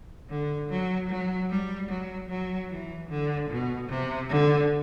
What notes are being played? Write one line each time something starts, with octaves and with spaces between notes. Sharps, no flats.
D3
F#3
F#3
G3
F#3
F#3
E3
D3
B2
C3
D3